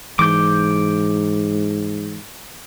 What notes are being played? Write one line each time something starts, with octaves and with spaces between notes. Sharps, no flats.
G#2 E3 D6 G6